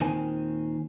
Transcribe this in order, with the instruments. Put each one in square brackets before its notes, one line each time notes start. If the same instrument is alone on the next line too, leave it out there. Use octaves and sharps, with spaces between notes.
[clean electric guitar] D#2 A#2 D#3 C4 G#5